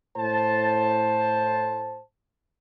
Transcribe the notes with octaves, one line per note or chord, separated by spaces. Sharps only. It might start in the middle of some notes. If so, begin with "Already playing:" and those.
A2 C5 A5